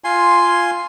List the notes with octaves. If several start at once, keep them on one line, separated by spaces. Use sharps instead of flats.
F4 G#5 C6